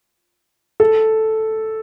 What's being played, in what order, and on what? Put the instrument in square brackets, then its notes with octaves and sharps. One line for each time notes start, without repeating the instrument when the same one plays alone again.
[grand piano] A4